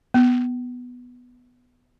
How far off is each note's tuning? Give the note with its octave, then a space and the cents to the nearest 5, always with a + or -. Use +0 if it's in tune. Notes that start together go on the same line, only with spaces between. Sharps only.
B3 +0